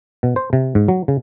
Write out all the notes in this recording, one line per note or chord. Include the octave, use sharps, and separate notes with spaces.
B2
C5
C3
G#2
F#3
C#3